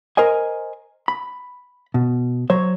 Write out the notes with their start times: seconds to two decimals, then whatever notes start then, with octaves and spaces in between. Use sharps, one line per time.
0.17 A#4 C5 D#5 G#5
1.08 B5
1.94 B2
2.50 F#3 C5 C#5